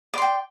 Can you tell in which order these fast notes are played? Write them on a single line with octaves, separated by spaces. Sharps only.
D5 C6 G5